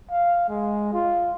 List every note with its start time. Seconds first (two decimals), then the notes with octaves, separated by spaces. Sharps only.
0.11 F5
0.49 G#3
0.93 F4